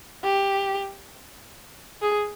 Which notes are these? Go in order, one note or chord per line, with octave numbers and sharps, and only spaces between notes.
G4
G#4